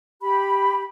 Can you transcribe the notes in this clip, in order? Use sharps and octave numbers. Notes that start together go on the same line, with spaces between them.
G4 B5